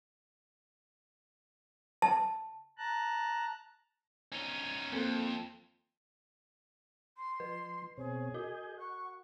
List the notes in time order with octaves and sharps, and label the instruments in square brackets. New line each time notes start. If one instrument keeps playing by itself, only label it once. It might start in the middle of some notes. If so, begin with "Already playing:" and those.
[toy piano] A5
[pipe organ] A5 A#5 F#6
[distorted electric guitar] C#4 D#4
[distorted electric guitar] F2 [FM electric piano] A#3 C4 A4
[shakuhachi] C6
[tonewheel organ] F3 [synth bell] B4
[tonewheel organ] B2 C4 C#5 [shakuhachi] G#4
[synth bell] F#4 [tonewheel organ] D#5 G6
[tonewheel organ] F#5 [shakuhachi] C#6